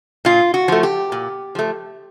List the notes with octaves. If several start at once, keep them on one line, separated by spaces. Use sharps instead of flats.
A#2 F4
F#4
F3 A3
G4
A#2
F3 A3